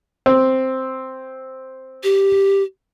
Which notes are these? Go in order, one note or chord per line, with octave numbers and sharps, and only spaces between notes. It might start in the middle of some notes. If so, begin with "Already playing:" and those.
C4
G4